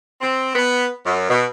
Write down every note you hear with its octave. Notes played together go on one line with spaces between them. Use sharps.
C4
B3
F#2
B2